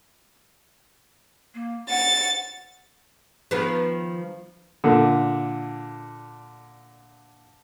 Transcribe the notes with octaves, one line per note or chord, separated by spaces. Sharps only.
A#3
F#5 A6
D#3 F3 B3
A#2 D3